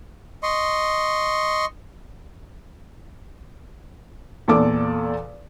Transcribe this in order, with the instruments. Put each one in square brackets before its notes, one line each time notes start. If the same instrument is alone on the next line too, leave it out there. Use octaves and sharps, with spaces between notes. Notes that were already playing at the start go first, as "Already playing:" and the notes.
[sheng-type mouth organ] D#5 C6 C#6
[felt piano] E2 A#2 A4 D6